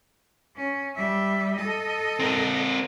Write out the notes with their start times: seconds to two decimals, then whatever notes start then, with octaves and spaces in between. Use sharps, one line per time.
0.56 C#4
0.96 G3 E5
1.56 A4 D#5
2.19 C4 A#4